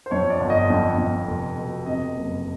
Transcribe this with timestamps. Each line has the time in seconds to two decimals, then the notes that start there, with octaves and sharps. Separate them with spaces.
0.06 C5
0.11 F2 C#5
0.30 D5
0.40 G1
0.50 D#5
0.70 F2
0.98 F2
1.28 F1
1.57 B2
1.86 C3 D#5
2.16 F#1